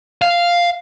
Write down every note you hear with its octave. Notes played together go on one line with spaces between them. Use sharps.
F5